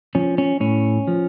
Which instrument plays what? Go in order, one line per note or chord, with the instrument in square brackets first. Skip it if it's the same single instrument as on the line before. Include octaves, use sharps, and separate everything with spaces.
[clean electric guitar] F3 C#4
C#4
A2 C#4
F3